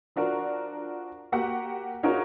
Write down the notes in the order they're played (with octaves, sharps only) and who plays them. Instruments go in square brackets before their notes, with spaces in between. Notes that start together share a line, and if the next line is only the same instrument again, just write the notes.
[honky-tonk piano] F3 D4 F#4 A#4
A#3 F#4 G4 F#5
C#4 D#4 F4 F#4 G#4 A#4